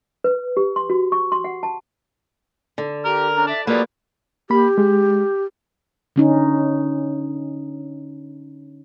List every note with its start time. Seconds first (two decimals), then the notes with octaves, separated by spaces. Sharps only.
0.24 B4
0.57 G4
0.76 C6
0.90 F#4
1.12 C#6
1.32 C6
1.44 F#5
1.63 A5
2.78 D3
3.05 G4 A#4 F6
3.33 C#4 D4 A#5
3.47 D5 E5 A5
3.67 F3 F#3 A#3 G#4 B4 D5
4.50 A#3 G4 B5
4.78 G#3
6.16 D3 C#4 D#4